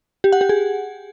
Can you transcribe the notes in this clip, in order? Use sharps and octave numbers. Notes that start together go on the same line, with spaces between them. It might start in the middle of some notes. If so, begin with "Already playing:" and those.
G4
F#5
G4
G#4